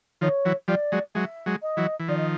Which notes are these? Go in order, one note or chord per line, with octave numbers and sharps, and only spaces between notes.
D#3 F3 C#5
E3 F#3
F3 G3 D5
F#3 G#3
F#3 G#3 E5
F#3 G#3
D#5
E3 F#3
E3
D#3 F3 D5
D#5